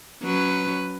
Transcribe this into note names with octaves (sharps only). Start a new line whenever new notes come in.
F#3 C#4 B4